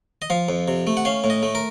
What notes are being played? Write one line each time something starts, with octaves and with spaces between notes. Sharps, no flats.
D#5
F3 F5
F2
C3
A3
F#5
C#4 F5
A2
D#5
A3
A#4